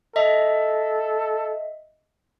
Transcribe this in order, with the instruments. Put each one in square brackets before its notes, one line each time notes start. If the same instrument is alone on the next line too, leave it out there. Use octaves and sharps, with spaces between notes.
[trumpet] A4 [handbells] D#5 E5